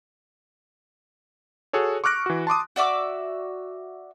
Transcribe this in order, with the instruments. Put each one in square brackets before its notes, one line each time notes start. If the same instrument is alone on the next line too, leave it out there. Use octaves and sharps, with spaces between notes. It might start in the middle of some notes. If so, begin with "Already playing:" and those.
[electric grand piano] F#4 G#4 A4 C#5
C#6 D6 F6 F#6 A#6 D7
E3 F#4
A5 C6 D6 D#6
[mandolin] F#4 D5 E5 D6